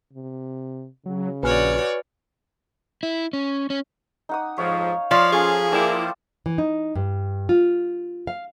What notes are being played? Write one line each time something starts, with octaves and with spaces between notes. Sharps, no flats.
C3
C#3 F#3
A#1 F#4 B4 C#5 D5 G#5 F6
E4
C#4
C#4
D#4 F#5 D#6
F2 G#2 F3 C#5 F5
F3 C#5 D5 F5
C#4 F4 G#4 A4
A#3 E4 D5 G5 A5
E3
D#4
G2
F4
F5